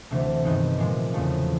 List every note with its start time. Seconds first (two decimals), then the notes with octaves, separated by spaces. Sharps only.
0.11 D2 C3 E3 A3
0.45 G2 D#3 G#3 B3 D#4
0.78 A#2 F3 G#3
1.14 E2 C#3 F3 A3